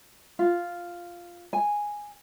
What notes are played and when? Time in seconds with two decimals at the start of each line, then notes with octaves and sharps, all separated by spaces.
0.39 F4
1.53 G#5